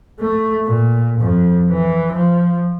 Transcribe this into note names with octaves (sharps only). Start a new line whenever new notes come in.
A3
A#2
F2
E3
F3